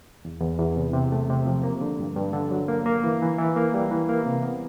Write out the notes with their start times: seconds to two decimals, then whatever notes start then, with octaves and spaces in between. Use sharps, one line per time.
0.25 E2
0.41 E2
0.59 E2
0.76 C3
0.94 C3
1.12 A3
1.30 C3
1.46 F3
1.63 A#3
1.81 D3
1.99 G2
2.16 G2
2.33 D3
2.51 F#3
2.68 A#3
2.86 A#3
3.04 E3
3.22 E3
3.38 E3
3.56 A#3
3.74 G3
3.91 E3
4.09 A#3
4.26 C3
4.43 B3